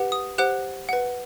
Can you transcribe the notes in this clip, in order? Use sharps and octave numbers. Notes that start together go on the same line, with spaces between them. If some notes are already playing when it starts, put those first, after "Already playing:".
Already playing: G4 B4 F#5
D#6
G4 C5 F#5 F#6
B4 F#5